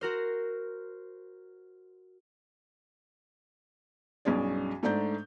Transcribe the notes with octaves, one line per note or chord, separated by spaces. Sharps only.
F#4 A#4 C5
B1 G2 C#4 G#4 D5
G#2 A3 D4 D5 A#5 G6